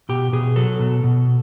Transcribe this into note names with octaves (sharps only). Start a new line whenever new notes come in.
B2 G4
B2 G#4
F#3 A4
B2
B2